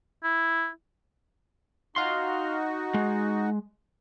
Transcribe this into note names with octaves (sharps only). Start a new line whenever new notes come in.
E4
D#4 F#4 F5 C6
G#3